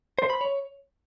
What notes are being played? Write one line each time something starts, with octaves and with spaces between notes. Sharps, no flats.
C5
B5
C#5